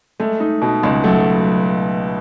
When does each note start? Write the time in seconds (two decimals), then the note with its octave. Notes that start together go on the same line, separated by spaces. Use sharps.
0.20 G#3 A3
0.40 D#4
0.62 B2
0.83 C#2 G#3
1.04 F#3 A3